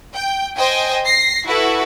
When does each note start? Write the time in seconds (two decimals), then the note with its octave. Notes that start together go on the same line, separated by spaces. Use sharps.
0.15 G5
0.57 C5 D#5 G5 G#5
1.04 A#6 C7
1.47 E4 F#4 A4 B4